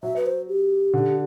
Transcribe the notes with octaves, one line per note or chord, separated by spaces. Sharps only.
F#3 E5
B4
C5
G4
D3